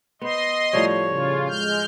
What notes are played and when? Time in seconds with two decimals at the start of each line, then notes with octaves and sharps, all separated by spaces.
0.21 B3 C5 D#5 C6
0.73 A2 F3 G3 C#5
1.08 C#3 F4
1.48 G#3 F6 G6